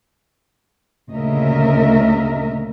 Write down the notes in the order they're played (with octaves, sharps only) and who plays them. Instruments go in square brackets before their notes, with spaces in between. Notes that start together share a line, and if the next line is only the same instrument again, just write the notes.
[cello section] D2 A#2 C#3 A#4 D#5 E5